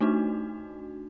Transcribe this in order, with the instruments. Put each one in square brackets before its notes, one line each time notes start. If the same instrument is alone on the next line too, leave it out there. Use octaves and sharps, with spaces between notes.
[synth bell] A3 D4 D#4 F#4